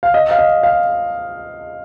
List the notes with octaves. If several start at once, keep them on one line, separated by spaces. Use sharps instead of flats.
F5
D#5
F5
D#5
F5